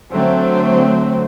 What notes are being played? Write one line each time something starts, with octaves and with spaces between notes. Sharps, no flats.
D3 F#3 A3 C4